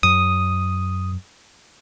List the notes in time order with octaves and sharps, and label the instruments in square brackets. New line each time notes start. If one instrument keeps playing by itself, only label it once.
[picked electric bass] F#2 [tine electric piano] D#6